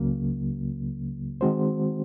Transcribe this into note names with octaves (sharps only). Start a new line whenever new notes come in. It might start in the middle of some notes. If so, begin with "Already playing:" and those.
Already playing: C#2 C#3 F#3 A#3
D#3 G#3 C4 F#4 C5